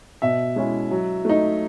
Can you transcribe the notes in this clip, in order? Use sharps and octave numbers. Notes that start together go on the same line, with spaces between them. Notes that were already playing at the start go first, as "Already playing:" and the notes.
B2 E5
G#3 C#4 E4
F#3
A3 D#4